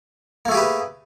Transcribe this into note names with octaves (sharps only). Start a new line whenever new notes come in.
A3 A#3 G4 G#4 B4